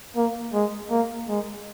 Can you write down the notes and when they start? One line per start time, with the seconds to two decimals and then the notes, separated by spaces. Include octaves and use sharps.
0.16 A#3
0.54 G#3
0.90 A#3
1.28 G#3